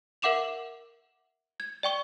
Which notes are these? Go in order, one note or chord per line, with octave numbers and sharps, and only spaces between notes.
A#4 E5 F#5 D6 E7 F7
G#6
D5 G5 C#6 G7